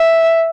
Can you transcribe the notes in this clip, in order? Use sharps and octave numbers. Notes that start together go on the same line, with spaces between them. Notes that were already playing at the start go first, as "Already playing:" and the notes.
Already playing: E5